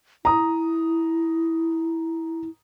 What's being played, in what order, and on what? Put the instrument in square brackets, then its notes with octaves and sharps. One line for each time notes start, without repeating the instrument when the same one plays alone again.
[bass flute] E4 [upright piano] A#5 D#6